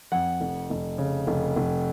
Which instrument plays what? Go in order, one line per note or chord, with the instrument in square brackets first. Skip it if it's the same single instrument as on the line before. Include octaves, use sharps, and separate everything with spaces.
[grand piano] F2 F#5
F1
F1
C#3
F1
F1